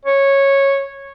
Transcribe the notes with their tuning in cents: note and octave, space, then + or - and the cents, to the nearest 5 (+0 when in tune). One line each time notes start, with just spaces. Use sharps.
C#5 -10